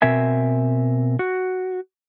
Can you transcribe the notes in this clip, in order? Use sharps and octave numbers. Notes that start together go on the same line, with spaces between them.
B2 C4 A#4 E5 G#5
F#4